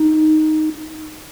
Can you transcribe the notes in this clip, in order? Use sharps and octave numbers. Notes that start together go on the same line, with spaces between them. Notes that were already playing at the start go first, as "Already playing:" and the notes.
Already playing: D#4